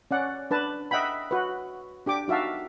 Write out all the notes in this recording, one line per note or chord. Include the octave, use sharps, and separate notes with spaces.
C#4 D5 F#5
D4 B4 A5
D#5 E5 F#5 G5 B5
F#4 B4
D4 G4 G5 D6
D#4 F#4 E5 F5 A5